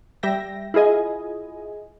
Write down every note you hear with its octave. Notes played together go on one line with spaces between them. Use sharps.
G3 E5 G5 A#6
E4 F4 G#4 D#5 G#5